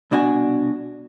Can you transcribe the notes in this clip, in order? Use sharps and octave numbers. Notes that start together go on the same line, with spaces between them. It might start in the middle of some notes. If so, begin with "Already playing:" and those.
C2 B2 D4 F#4 G#5